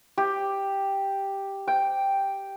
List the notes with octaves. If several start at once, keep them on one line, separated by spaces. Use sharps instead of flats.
G4
G5